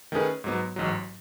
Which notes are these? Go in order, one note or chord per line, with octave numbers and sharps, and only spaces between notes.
D#3 A3 C#4 G#4 B4
G#2 F#3 B3
A1 G#2 F#3